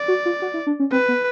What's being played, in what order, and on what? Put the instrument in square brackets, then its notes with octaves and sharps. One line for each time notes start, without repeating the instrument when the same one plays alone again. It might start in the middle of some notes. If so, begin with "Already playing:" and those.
Already playing: [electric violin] D5
[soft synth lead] F#4
F4
F#4
E4
D4
C#4
[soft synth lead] C4 [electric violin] B4
[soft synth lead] B3